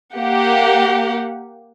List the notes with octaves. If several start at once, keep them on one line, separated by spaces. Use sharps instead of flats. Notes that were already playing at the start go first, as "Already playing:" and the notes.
A#3 G4 F#5